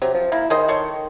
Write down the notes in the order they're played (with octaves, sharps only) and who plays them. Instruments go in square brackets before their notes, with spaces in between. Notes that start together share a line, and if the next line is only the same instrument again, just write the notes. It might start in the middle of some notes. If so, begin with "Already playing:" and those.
[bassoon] C3 [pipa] F#3
[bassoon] F3
[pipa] A#3 [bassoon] E4
[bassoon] D#3 [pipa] G#4 C5 D#5
[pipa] A4 C#5 C6